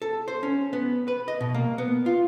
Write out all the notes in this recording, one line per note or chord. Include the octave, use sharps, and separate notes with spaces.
A4
C5
C#4
B3
B4
D#5
B2
A#3
B3
F4